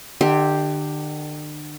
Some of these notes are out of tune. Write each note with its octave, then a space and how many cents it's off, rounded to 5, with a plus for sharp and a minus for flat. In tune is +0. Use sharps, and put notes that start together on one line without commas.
D3 +40 G4 +0 E5 -15